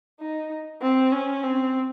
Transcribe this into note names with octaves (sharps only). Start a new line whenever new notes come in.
D#4
C4
C#4
C4